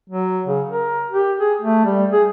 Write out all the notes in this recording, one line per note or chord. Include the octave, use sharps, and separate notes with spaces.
F#3
C#3
A#4
G4
G#4
A3
G3
G#4